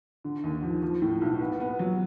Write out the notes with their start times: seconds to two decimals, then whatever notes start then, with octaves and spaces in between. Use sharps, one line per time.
0.24 D3
0.44 D#2
0.63 F3
0.82 F3
1.02 A2
1.21 B1
1.41 B3
1.60 B3
1.79 F#3